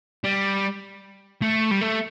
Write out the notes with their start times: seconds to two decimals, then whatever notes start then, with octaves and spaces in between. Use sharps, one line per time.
0.24 G3
1.42 A3
1.71 G3
1.81 A3